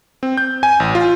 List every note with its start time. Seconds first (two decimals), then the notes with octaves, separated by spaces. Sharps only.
0.23 C4
0.37 G6
0.63 G#5
0.80 A1
0.95 F4